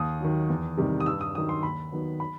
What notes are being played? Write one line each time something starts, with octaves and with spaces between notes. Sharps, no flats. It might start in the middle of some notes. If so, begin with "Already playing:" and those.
Already playing: D#2 D#6
D#3 F#3
E2
C3 D#3 G3
D#6
G2 E6
D#6
D#3 F#3 D#6
C6
D#2 B5
D#3 F#3 B3
B5